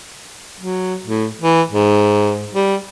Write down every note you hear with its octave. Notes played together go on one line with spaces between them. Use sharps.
F#3
A2
E3
G#2
G3